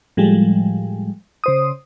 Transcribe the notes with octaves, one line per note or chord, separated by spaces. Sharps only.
A2 F3 G3 G#3
C#3 C5 D#6